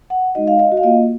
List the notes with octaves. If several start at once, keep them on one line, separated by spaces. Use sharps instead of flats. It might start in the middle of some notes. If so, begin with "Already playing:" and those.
F#5
G#3 D#4 F#4 D#5
F5
D#5
F#4
F5
A#3 F4 D#5